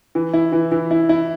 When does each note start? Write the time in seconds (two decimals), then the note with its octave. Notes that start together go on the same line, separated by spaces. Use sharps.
0.15 E3
0.33 E4
0.52 E3
0.72 E3
0.91 E4
1.09 E4